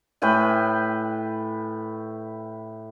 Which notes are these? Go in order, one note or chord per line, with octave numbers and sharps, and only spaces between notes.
A2 B4 G5 G#5